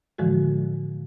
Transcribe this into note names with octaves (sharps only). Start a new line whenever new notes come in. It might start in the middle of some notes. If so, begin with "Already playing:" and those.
A2 D3 E3 F3 G#3 F#4